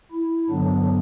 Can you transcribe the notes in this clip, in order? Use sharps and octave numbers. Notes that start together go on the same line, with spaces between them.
E4
G2 D3 F#3 B3 D4